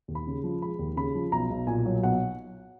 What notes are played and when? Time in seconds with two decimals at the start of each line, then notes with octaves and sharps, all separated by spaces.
0.08 D#2
0.15 B5
0.27 C#3
0.44 F3
0.61 G#3 B5
0.79 D#2
0.96 C#3 B5
1.15 F3
1.32 B1 A#5
1.50 B1
1.67 A#2 G#5
1.86 F#3
2.03 B1 F#5